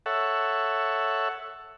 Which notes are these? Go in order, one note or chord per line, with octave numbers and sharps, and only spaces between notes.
A4 C#5 E5 F#5